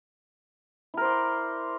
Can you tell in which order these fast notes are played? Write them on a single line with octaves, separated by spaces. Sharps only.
E4 A#4 C5 D5